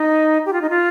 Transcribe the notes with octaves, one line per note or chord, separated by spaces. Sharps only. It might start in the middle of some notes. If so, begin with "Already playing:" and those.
Already playing: D#4
G4
F4
D#4
F4